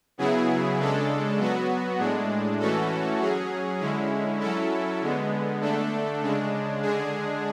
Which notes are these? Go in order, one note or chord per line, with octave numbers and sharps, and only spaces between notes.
C#3 F#3 B3 E4 G#4
C#3 G#3 D4 A4
F#3 B3 F#4
A2 G#3 D4
E3 A3 C#4 F#4 A4
F#3 C#4 G#4
D3 G#3 C#4 E4
F#3 C#4 E4 A4
D3 G#3 B3
D3 A3 D4 A4
C#3 G#3 D4
D3 G#3 D4 G#4